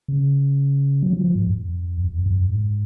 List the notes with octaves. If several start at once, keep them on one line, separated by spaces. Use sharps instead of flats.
C#3
F#3
F3
F3
G#2
F2
F2
F2
F#2
G#2